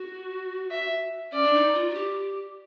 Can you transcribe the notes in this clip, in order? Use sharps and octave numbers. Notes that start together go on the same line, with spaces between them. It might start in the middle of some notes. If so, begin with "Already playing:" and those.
Already playing: F#4
E5
C#4 D5
D4
D#4
F4
F#4
G4